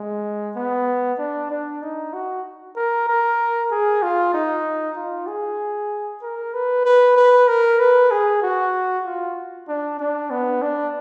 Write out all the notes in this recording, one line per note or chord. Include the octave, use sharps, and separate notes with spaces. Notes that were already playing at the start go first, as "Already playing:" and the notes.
Already playing: G#3
B3
D4
D4
D#4
F#4
A#4
A#4
G#4
F4
D#4
F4
G#4
A#4
B4
B4
B4
A#4
B4
G#4
F#4
F4
D4
D4
B3
D4